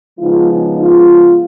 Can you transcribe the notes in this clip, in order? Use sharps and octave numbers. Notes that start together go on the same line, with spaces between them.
C#3 F3 G#3 B3 D#4 F4
D#4
F4